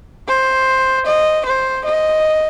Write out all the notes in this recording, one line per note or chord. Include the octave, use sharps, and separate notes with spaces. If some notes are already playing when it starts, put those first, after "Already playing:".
C5
D#5
C5
D#5